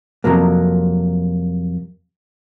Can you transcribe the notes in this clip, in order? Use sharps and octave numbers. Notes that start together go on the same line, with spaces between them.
F2 A2 C3 F#3 A#3